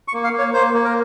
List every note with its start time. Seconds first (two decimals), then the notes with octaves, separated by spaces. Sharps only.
0.08 C#6
0.14 A#3
0.24 F5
0.33 A#3
0.38 C#5
0.54 A#3 C5
0.74 A#3
0.85 A#4